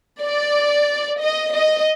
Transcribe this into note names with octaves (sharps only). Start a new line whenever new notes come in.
D5
D#5
D#5